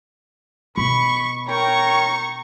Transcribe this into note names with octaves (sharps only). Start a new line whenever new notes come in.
B2 B5 C#6
A#4 C#5 G5 A#5 C#6